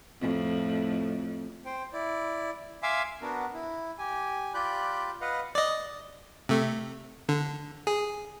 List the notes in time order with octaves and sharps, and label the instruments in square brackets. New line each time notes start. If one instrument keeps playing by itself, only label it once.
[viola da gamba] F2 A2
[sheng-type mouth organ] C5 G5
E4 D5
E5 F5 G#5 C6 D6 E6
B3 D4 F#4 A#4
E4
G4 G#5
F4 G4 D5 B5 F#6 G6
B4 D#5 F5 F#5
[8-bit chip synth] D5 D#5
C3 A3
D3
G#4